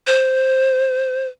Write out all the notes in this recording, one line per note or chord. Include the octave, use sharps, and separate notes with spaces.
C5